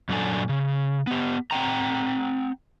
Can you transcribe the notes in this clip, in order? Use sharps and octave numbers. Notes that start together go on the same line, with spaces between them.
F#2 A#2 F#3 D4 A4 G#5
C#3
B3 G4
C4 F#5 G5 A#5